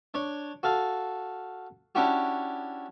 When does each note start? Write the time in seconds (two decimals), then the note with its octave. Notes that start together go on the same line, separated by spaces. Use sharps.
0.14 D4 C#5
0.63 F#4 A4 F5
1.95 C#4 D4 E4 F#4 G4